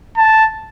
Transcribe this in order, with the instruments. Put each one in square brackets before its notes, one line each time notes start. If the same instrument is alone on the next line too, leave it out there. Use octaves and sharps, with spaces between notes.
[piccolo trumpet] A5